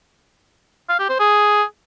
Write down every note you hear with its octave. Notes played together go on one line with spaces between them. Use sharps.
F5
G4
C5
G#4